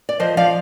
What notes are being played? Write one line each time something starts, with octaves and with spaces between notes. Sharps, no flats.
D5
F3 C5 D#5
F3 D5 F5